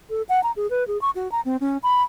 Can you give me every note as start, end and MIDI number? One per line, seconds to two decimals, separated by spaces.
0.10 0.22 69
0.29 0.42 78
0.43 0.52 82
0.56 0.69 68
0.70 0.86 71
0.87 1.00 68
1.01 1.10 85
1.15 1.30 66
1.32 1.41 82
1.45 1.57 60
1.61 1.78 61
1.83 2.02 83